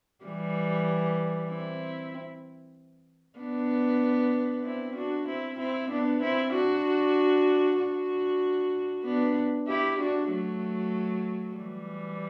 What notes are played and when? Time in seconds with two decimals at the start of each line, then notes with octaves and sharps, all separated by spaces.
0.25 E3 G3
1.50 C4 E4
3.39 B3 D4
4.64 C4 E4
4.96 D4 F#4
5.27 C4 E4
5.59 C4 E4
5.90 B3 D4
6.22 C4 E4
6.53 D4 F#4
7.78 D4 F#4
9.04 B3 D4
9.68 E4 G4
9.98 D4 F#4
10.30 F#3 A3
11.55 E3 G3